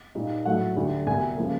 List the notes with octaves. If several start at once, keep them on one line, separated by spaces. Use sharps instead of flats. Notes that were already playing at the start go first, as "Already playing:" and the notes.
A#2 G3 A#3 D#4
A2 F#3 A3 F#5
D2 D3 G3
C2 B2 G3 G#5
C#3 F3 A#3